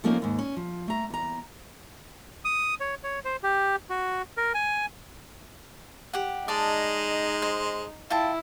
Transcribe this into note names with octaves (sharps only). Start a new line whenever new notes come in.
F3 A3 A#3 C4 C#4 D#4
D#2 G#2
C#4
F3
A3 A#5
E2 A#5
D#6
C#5
C#5
C5
G4
F#4
A#4
G#5
G4 F#5
G#3 D#4 D5 A5
C5
E4 F4 G5 A5